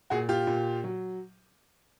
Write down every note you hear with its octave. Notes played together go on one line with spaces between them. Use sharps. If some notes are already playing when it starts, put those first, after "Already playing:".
A#2 F#4 G#4
F4 G4
A#2
F#3